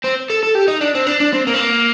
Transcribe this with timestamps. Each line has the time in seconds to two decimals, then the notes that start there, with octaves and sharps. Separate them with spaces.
0.04 C4
0.30 A4
0.43 A4
0.55 G4
0.68 D#4
0.81 D4
0.95 C4
1.07 D4
1.20 D4
1.33 C4
1.47 A#3
1.54 C4
1.60 A#3